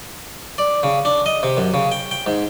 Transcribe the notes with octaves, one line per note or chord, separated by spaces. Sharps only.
D5
C#3
D4
D#5
C3
F#2
C#3
G5
G5
G#2